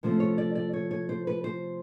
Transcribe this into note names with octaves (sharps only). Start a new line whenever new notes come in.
C3 F3 A3 C#4 C5
C#5
D5
D5
C#5
C#5
C5
B4
C5